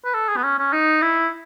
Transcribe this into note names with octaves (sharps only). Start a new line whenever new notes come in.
B4
A4
G#4
B3
C#4
C#4
D#4
E4